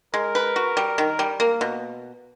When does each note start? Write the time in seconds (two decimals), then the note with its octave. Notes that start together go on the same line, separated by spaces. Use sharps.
0.14 G#3 A#4
0.35 B4
0.56 F#4
0.77 G3
0.98 D#3
1.19 G3
1.40 A#3
1.61 B2